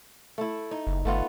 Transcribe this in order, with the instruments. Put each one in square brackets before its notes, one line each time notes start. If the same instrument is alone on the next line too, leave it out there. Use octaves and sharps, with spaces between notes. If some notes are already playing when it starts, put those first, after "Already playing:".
[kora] A3 E4
D#4
[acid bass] F#1
[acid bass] G1 [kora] A3 B3 F4